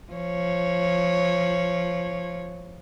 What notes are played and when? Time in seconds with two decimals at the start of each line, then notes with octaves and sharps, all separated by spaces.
0.13 F3 C#5